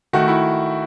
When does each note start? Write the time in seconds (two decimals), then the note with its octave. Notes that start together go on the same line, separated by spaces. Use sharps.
0.13 D#3 A3 F#4
0.28 E4